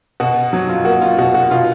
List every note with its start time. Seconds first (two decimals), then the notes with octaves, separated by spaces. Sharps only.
0.20 B2 F#4
0.53 F#3
0.69 F4
0.85 A#3 F#4
1.02 F4
1.18 B2 F#4
1.34 F#4
1.51 B2 F4